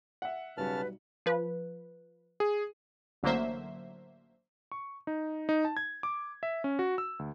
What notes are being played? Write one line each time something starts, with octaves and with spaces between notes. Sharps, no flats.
E5 F#5
B1 C#3 G3 F#4 B4 A5 F6
F3 B4
G#4
A1 D3 F#3 A#3 C5 E5
C#6
D#4
D#4
A5
G#6
D6
E5
C#4
F#4
E6
D2